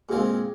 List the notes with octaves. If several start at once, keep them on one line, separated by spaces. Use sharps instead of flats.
A#2 G#3 C4 F4 G#4